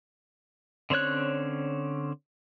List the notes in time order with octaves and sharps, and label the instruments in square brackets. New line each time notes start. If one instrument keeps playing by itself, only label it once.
[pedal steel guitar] D3 C4 C#4 C#5 F#6